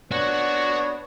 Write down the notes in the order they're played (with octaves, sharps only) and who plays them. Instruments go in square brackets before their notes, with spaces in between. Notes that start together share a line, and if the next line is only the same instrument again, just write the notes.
[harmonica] B3 D4 C#5 [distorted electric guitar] F#4 F#5